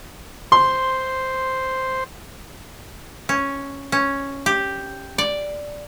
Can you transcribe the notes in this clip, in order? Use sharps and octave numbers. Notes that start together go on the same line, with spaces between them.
C5 C6
C#4
C#4
G4
D5